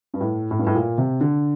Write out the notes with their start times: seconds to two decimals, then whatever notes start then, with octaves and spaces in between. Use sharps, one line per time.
0.14 G2
0.21 A2
0.51 A2
0.59 G2
0.67 A2
0.75 A#2
0.98 C3
1.21 D3